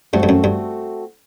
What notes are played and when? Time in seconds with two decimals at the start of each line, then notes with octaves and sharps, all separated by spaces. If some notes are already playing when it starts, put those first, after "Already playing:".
0.13 G2 A3 C4 F#4 A4
0.23 G2
0.29 F#2
0.44 G2